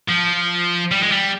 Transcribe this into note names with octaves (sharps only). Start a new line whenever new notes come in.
F3
G3
G#3
G3